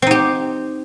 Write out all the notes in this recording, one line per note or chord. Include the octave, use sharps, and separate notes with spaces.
C4 D#4 G4